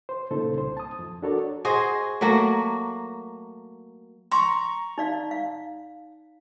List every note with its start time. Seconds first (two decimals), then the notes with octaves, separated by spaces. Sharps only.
0.09 C5
0.31 A#2 C#3 D#4 A4 C5
0.55 C2 C5
0.77 A5 D#6
0.99 F2
1.23 D4 F#4 A4 A#4 C#5 D5
1.65 F#4 G#4 C5 D#5
2.21 F#3 A3 A#3 F#4
4.32 A#5 C6 C#6
4.98 D#4 D5 F5
5.31 F5